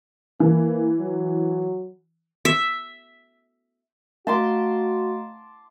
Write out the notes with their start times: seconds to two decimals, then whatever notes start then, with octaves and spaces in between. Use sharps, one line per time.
0.40 E3 A#3
0.99 F#3
2.45 E5
4.27 A3 F#4 F5 A5 A#5 C6 D6